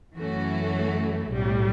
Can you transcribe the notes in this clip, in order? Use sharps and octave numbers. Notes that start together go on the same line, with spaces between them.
F#2 E3 A3 C#4 F#4
B1 A2 G3